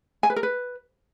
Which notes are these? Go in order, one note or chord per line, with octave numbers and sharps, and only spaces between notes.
G#5
B4
A#4
B4